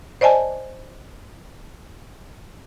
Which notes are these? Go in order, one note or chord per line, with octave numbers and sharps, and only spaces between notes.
C5 D5 D#5 G#5 A5